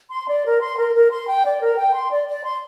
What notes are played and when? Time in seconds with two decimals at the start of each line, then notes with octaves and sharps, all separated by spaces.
0.10 C6
0.28 D5
0.44 A#4
0.61 C6
0.78 A#4
0.94 A#4
1.11 C6
1.27 G5
1.44 D5
1.61 A#4
1.77 G5
1.94 C6
2.11 D5
2.26 D5
2.44 C6